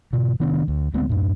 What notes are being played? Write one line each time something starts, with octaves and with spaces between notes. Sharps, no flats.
G#2 B2
C3 D#3 B3 D4
D2
D2 G#3 B3 C4
F#2 A2